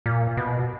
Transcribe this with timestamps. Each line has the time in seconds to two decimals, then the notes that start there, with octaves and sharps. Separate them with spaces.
0.06 A#2
0.37 B2